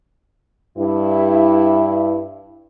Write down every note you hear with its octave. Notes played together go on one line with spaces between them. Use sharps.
G2 E4